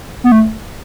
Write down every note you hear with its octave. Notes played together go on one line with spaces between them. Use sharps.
B3
A3